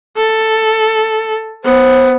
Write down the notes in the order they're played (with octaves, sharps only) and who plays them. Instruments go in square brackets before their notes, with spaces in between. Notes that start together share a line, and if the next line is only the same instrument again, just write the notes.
[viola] A4
[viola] B3 [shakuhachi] C5